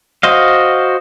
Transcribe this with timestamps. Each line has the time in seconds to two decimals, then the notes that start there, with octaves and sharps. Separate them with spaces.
0.23 F#4 C5 D#5 F5